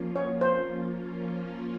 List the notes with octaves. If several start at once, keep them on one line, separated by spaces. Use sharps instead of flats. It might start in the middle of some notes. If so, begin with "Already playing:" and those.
Already playing: F3 A#3 C#4 F4
C#5
C5